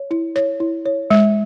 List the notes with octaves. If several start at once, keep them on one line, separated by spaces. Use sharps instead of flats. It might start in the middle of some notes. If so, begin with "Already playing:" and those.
Already playing: C#5
E4
C#5
E4
C#5
G#3